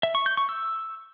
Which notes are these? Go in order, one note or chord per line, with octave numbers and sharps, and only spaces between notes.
E5
C#6
G6
C#6
E6